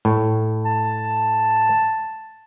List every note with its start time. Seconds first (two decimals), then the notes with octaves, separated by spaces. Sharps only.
0.05 A2
0.65 A5